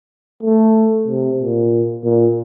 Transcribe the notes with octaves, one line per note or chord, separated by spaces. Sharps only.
A3
C3
A#2
A#2